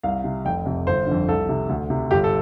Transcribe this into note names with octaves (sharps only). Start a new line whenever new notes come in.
C2 F5
C3
F1 G5
F2 C3
G1 C5
F2 D3
C2 A4
C3
D2
C3
G1 G4
A4